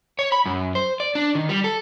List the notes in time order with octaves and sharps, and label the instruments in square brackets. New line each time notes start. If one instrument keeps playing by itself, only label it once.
[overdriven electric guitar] C#5
B5
F#2
C5
D5
D4
D#3
G3
A4